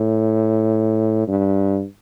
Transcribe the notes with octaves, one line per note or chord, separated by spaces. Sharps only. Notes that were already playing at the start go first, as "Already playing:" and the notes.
Already playing: A2
G2